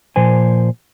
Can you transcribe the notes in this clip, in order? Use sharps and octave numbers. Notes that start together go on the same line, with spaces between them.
A#2 F3 C5 G#5